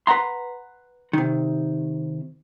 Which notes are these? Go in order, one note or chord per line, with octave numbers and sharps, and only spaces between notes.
B4 F#5 A#5 C6
C3 D#3